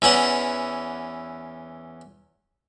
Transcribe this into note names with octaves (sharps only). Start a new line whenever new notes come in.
E2 E3 C#4 F#5